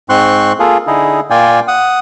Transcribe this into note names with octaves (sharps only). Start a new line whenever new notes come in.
G#2 C4 C6 C#6 F#6
A#3 F4 G#4 A4
D3 D#4 E4 G#4
A#2 F4 D5 G5 G#5
F#5 D#6